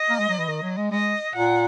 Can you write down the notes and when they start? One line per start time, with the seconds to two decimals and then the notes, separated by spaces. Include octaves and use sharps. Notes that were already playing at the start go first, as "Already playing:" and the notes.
Already playing: D#5
0.09 A#3
0.19 G#3
0.29 F#3
0.38 E3
0.48 D#3
0.62 F#3
0.77 G#3
0.91 G#3 D#5
1.35 A#2 F#5